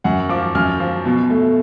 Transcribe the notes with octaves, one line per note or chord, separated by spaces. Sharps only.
F#2 F#5
F3 D6
F#2 F6
F3
B2
A3